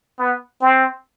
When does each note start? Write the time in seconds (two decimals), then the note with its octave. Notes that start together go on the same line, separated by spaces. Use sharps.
0.19 B3
0.61 C4